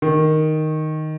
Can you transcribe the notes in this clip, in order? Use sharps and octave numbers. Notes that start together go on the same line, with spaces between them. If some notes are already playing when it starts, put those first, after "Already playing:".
D#3